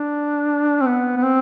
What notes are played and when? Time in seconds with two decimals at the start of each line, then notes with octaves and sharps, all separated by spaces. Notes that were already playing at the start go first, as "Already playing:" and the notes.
Already playing: D4
0.81 C4
0.86 B3
1.17 B3
1.23 C4